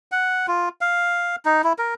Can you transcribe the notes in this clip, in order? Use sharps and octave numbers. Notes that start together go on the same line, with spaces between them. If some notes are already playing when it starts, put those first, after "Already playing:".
F#5
F4
F5
D#4
E4
A#4